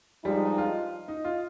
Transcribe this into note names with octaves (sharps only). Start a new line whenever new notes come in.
G2 F3 G3 G#3 D#4
F4
D#4
F4